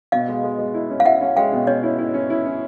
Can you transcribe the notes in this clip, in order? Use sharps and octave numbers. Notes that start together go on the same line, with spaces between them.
B2 D#5 F5
G#3
G#3
G#3
E4
C#4
F5
E4 E5 F#5
C#4
G#3 F5 G5
B2
C#4 C#5 D#5
E4
E4
C#4
E4
C#4